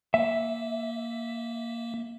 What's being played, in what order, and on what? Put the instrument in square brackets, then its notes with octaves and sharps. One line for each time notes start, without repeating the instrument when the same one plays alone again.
[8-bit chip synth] A#3 [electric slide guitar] E5